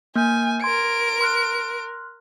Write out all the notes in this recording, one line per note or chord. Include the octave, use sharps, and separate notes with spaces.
A#3 G#5 F6 G6
A#4 C6 G#6 D7
C6 F6 F#6